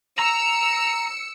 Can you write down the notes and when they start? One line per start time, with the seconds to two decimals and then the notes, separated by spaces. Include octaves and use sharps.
0.19 A#5 E6 C#7